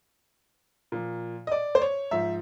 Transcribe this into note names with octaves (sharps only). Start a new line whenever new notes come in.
A#2 F3
D#5
D5
C5
C#5
G#2 F3 E5